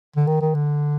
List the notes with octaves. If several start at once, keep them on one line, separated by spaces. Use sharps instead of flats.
D3
D#3
D#3
D3